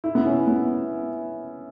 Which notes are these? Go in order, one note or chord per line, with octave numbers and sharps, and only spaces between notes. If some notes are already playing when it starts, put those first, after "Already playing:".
E4
B3
C#4
B3